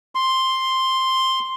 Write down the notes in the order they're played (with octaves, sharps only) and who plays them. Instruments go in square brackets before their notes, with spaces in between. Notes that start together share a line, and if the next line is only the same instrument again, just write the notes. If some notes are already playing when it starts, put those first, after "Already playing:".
[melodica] C6